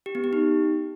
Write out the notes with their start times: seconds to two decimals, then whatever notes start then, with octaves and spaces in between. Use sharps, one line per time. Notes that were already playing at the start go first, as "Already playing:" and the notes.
0.06 G4
0.15 B3
0.24 G4
0.33 D#4